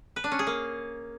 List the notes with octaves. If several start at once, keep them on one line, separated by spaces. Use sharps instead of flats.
B4
D4
C#4
G#4
A#3